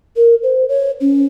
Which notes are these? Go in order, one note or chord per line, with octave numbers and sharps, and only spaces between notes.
A#4
C5
C#5
C#4